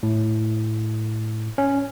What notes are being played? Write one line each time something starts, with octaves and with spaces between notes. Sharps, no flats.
A2
C#4